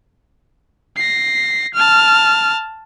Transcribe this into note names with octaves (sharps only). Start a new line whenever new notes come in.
A#6 C7
A5 F6